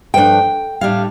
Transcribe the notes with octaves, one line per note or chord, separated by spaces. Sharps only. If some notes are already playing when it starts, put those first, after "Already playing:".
G2 F3 A3 D4 G5
A2 G3 D4 F5